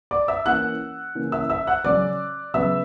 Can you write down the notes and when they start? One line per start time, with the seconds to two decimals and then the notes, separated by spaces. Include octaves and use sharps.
0.11 D5 D6
0.28 E5 E6
0.46 E3 A#3 C#4 F#5 F#6
1.15 C#3 E3 A#3 C#4
1.32 E5 E6
1.50 E5 E6
1.67 F#5 F#6
1.85 C#3 F#3 C#4 D5 D6
2.54 C#3 F#3 B3 E5 E6